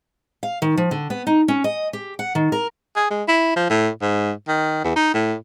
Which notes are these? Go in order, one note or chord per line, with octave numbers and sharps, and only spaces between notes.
F5
D#3
F3
D3
B3
D#4
C#4
D#5
G4
F#5
D#3
A#4
G#4
G#3
E4
F3
A2
G#2
D#3
E2
D#4
A2